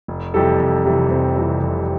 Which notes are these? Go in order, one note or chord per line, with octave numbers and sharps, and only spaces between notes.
F1
F2 C3 E3 G3 A4
F1
F2 C3 E3 G3
F1 C4
F2 C3 E3 G3
F1